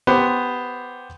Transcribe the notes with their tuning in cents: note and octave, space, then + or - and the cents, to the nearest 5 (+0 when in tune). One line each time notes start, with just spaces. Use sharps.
B3 +10 G4 +0 C5 +0